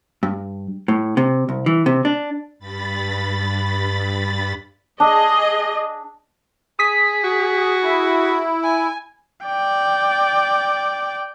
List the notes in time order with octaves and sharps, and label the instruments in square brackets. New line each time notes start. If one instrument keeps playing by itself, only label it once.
[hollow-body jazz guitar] G2
A2
C3
C2
E3
C3
D4
[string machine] G2 B5 A6
[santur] D4 [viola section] G#4 D#5
[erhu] G#4 [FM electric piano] D#6 B6
[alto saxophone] F#4
[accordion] E4
[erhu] G#5
[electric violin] D5 G5